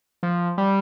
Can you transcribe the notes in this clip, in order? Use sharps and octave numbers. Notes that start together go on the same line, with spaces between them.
F3
G3